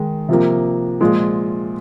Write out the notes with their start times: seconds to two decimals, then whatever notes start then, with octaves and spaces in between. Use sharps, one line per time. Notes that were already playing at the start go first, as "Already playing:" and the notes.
Already playing: D#3 G#3
0.29 C3 F3 A#3
1.01 A#2 F3 G#3 F4